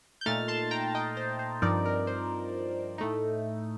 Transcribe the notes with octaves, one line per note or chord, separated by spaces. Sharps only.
G6
A#2 A3 D#4 F6 A6
A5 C6
G5 A#5
D#5 G5
C5
C5
G2 F3 C4 D#4 A#4 D5
A#4
C5
A2 A3 D#4